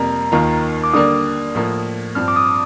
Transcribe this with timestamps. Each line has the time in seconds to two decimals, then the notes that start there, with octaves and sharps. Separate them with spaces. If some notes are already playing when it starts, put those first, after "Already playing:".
Already playing: F2 C3 G3 A#3 A#5
0.32 D#2 D#3 A#3 F4
0.84 D6
0.93 D3 G3 A#3 D4 D#6
1.55 A2 F3 A#3
2.15 G2 F3 C4 F6
2.28 D6
2.36 D#6